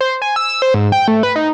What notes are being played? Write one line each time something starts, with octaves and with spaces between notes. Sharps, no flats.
C5
G#5
E6
E6
C5
G#2
G5
A3
B4
D#4